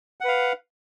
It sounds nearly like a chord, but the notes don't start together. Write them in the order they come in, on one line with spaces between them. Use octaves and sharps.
F#5 B4 F5